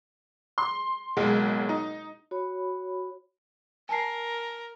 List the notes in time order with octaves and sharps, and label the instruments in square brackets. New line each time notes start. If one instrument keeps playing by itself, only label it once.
[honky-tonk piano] C6
F#1 B1 G#3
D#4
[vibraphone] F#4 C#5 B5
[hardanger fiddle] A#4 [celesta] G#5 A5 C7